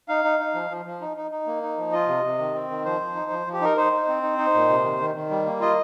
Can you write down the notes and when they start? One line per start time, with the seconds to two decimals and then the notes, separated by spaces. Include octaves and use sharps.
0.08 D#4 F5
0.24 D#4
0.40 D#4
0.55 F3
0.70 F3
0.85 F3
1.01 D#4
1.17 D#4
1.31 D#4
1.47 A#3
1.63 D#4
1.78 F3
1.93 F4 D#5
2.08 C3
2.24 C3
2.39 D#3
2.54 C4
2.70 D#3
2.85 F3 C5
3.01 F3
3.16 D#4
3.31 F3
3.47 F3
3.53 G4
3.61 D#4 A#4
3.77 D#4 C5
3.93 D#4
4.08 C4
4.22 D#4
4.38 D#4
4.54 A#2
4.69 C3
4.84 D#3
4.99 D#3
5.15 D#3
5.30 G3
5.46 A#3
5.61 F4 D#5